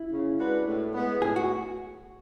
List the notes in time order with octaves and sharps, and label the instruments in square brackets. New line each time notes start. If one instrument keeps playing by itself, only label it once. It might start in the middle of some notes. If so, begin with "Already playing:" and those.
Already playing: [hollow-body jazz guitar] E4
[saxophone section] C#3
G#3 D4 F#4 B4
A2
G#3 B3
[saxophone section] A2 [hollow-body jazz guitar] G#4
[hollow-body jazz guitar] F#4